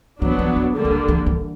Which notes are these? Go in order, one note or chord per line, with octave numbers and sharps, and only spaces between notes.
E3 F#3 B3 D4
F3
E3
D3 G3 A#3
D#3
E3
E3
E3